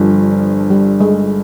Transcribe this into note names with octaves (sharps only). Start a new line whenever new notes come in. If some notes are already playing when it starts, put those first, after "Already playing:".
Already playing: G1 G2 F3
G3
G#3